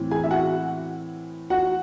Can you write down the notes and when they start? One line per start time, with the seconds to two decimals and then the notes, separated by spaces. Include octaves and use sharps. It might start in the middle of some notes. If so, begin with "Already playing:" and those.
Already playing: A2 E3 C4
0.11 G#4 G#5
0.23 E5
0.31 F#4 F#5
1.50 F#4 F#5